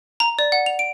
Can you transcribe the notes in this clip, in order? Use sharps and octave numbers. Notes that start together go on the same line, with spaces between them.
A#5
D5
F#5
F7
D7